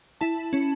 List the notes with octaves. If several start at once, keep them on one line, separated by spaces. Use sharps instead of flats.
E4 A5
C#4